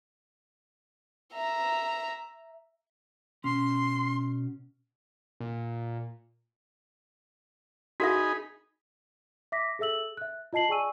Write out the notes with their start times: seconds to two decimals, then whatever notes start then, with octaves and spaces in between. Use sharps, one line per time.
1.33 E5 A#5
3.44 B2 C#4 C6
5.40 A#2
8.00 D#4 F#4 G#4 A#4 E5 B5
9.52 E5 D6 A#6 B6
9.79 G#4 A4 E5 E6 F#7
10.17 E5 F#6
10.53 F4 D#5 A5 C7 F#7
10.69 G#4 D5 G#5 C#6 E6 D#7